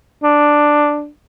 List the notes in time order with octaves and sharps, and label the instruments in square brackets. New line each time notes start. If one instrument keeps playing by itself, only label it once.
[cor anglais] D4